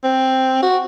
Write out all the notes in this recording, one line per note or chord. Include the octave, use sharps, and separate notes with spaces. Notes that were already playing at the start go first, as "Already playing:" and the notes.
C4
F#4